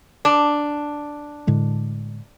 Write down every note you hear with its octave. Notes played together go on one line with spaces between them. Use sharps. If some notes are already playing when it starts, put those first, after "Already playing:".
D4
A2 D3 G#3